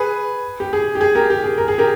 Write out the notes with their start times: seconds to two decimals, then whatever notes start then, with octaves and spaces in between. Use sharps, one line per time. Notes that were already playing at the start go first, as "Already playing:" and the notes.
Already playing: G#4 B4
0.60 G4
0.73 G#4
0.95 G4
1.01 G#4
1.15 G4 A#4
1.30 G4
1.44 G#4
1.58 A#4
1.68 G#4
1.78 G4 A#4